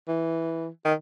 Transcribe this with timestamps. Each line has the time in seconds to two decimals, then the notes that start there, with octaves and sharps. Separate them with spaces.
0.08 E3
0.85 D#3